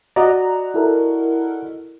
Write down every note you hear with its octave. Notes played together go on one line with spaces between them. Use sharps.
F#4 D5 D#5 A#5
E4 A4 A#4